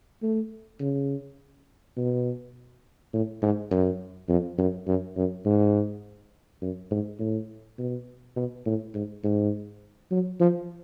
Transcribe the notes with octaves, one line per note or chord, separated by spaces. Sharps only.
A3
C#3
B2
A2
G#2
F#2
F2
F#2
F#2
F#2
G#2
F#2
G#2
A2
B2
B2
A2
G#2
G#2
F#3
F3